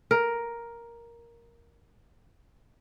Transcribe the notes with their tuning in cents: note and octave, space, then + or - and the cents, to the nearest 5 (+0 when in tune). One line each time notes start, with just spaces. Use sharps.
A#4 +5